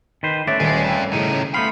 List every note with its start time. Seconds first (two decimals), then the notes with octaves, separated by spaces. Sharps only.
0.23 D#3 B4 C5
0.47 A3 C#4 B4 D5 E5
0.60 D#1 G#3 A6
0.84 F2 E6
1.13 A2 C#3 F3 D#4
1.54 A3 B3 F5 B5 C6 G6